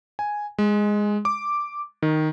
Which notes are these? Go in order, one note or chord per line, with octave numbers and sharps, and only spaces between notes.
G#5
G#3
D6
D#3